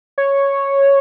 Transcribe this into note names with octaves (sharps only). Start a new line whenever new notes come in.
C#5